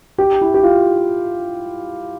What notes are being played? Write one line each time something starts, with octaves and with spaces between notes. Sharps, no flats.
G4
E4
G4
F4